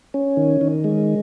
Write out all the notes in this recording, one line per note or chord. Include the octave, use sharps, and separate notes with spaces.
C#4
D#3
D#3
G#3